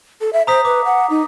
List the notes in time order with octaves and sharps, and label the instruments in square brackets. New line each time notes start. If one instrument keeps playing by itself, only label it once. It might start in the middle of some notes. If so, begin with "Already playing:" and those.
[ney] A4
E5
[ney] C5 [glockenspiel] A#5 D#6 B6
[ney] B4 [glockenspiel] D6
[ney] F#5
D#4